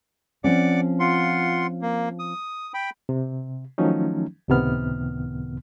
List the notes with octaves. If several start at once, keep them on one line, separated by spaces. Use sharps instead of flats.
F3 C4 C#4 D5 F#5 D6
F4 F#5 C6
A#3
D#6
G5 B5
C3
D#3 F3 F#3 A3 C#4 D#4
C#2 A2 C3 D#3 B3 F6